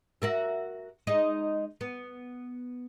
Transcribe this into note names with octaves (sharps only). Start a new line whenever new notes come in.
F#4 A#4 E5
G#3 D#4
B3